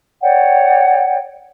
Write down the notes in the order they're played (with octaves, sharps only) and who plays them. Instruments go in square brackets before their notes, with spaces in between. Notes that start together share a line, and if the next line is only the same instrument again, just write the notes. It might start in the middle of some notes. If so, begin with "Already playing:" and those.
[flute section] C#5 D5 F#5 G5